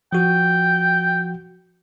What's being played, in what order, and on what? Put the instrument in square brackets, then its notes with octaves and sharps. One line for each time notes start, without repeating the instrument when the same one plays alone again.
[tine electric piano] F3 F#4 [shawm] G5